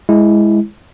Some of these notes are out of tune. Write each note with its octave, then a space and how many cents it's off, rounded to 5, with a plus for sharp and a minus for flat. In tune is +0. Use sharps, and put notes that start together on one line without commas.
G#3 +0 E4 +0